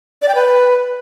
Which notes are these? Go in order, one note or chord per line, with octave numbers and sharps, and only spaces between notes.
D5
G5
B4